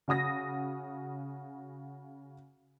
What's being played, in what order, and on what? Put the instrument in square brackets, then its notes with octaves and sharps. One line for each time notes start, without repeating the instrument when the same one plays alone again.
[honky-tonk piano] C#3 F#4 D#6 A#6